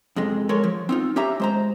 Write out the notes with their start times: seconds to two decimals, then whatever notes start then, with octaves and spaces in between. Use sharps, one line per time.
0.16 F2 C3 G#3
0.49 G#3 A4 A#4 C#5
0.64 F3
0.89 C4 D#4 F4
1.16 C#4 G4 E5 F5 A#5
1.40 G#3 C5 A#5